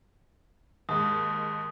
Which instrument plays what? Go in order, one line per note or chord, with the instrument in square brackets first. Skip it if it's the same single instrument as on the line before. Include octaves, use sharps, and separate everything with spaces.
[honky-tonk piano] D#2 G#2 [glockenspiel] D#6